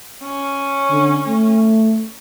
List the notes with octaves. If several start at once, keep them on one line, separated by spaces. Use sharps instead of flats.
C#4
D3
A3